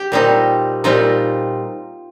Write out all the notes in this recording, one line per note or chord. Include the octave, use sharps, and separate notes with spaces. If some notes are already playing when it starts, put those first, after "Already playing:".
Already playing: G4
A#2 G3 C4 D#4
A#2 G3 C4 D#4 F4